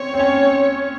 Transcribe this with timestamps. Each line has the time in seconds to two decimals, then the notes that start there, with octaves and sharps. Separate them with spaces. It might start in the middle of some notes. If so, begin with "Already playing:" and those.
Already playing: C4 C#4 C#5
0.14 C4
0.19 C#4